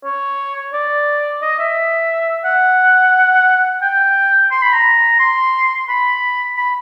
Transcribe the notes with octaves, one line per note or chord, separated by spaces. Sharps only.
C#5
D5
D#5
E5
F#5
G5
C6
B5
A#5
C6
B5
B5